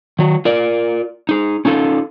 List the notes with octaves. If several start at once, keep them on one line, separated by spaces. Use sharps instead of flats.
D#3 F#3
F4 A#4 D5
D#4 G#4
C#4 D#4 F4 A4